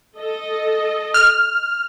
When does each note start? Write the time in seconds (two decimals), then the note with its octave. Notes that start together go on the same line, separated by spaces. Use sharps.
0.18 A4 D#5
1.14 F6